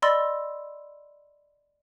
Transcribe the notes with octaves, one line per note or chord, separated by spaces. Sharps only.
D5 D#5 B5 C6 E6 A6